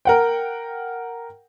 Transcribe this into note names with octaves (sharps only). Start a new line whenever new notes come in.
A#4 F#5 G5